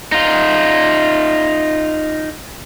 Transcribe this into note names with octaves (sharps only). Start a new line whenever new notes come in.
D#4 F4